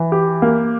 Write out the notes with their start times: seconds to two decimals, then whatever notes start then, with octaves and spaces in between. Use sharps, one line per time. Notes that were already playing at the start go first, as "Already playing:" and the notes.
Already playing: E3
0.12 G4
0.42 A#3